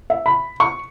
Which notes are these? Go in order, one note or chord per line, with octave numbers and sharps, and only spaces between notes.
E5
B5
C#6